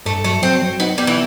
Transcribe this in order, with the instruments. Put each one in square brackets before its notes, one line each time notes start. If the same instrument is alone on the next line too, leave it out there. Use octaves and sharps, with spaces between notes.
[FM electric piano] G2 [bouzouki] A3
[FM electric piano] F#3 [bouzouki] A3
[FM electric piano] F#3 [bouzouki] C4
[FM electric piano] F#3
[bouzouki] B3 [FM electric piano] D#4
[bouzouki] G3 [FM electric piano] B3
[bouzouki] E3